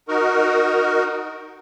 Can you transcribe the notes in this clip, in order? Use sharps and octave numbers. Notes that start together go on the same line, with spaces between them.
D#4 F#4 A#4